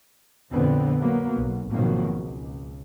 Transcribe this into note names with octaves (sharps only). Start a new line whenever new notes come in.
F2 A#2 D3 B3 C4
F#3 A#3 B3
B1
G#1 B2 D#3 F3 F#3 A#3
C#2